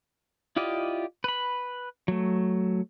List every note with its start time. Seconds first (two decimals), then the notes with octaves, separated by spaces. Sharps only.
0.56 E4 F4 G4 D5 D#5
1.24 B4 B5
2.08 F#3 A3